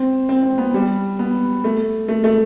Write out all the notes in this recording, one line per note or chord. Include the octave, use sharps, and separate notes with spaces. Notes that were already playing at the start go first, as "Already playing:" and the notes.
Already playing: C4
C4
C4
B3
G3
B3
A3
A3
A3